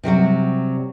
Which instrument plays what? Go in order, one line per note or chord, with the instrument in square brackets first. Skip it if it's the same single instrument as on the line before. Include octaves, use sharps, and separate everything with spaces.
[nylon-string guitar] C3 F#3 G3 F#4